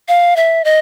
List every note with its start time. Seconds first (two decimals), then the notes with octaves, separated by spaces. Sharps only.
0.08 F5
0.36 E5
0.65 D#5